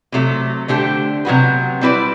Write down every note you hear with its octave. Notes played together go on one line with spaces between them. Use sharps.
C3 F#3 A3
D3 A3 D4 G4 C5
C3 F#3 B3 F#4 B4
G3 C4 E4 B4 D5